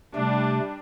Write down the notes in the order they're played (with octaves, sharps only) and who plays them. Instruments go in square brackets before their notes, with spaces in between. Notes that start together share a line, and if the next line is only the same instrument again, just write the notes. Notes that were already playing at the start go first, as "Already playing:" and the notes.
[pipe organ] C3 A3 [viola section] G3 D4